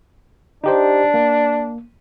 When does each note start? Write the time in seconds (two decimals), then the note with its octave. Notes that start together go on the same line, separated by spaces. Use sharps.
0.64 D4 D#4 G4 C5
1.14 A#3